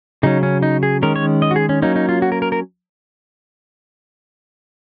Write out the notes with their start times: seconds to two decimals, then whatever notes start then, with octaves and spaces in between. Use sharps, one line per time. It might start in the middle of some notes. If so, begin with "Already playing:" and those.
0.23 C#3 F#3 C#4 D#4
0.43 C#4
0.63 D#4
0.83 G#4
1.02 D#3 G#3 C#4 A#4
1.16 C#5
1.42 D#5
1.51 F#4
1.56 G#4
1.69 C#4
1.82 F#3 A#3 C#4 D#4
1.96 D#4
2.09 F4
2.22 F#4
2.32 A#4
2.42 A#4
2.52 A#4